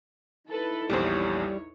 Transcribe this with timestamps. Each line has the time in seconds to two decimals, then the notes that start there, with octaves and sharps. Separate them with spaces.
0.50 D#4 E4 A4 B4
0.90 A#1 E2 G3 G4 C5 C#5